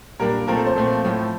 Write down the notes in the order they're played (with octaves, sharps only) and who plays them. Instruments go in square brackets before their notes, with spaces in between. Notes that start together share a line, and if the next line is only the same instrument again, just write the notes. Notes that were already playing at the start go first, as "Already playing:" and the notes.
[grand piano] A#2 G3 A#3 D4 A#4
A#2 F3 A3 C4 A#4
A4
C5
A#2 F3 A3 C4
A2 F3 A3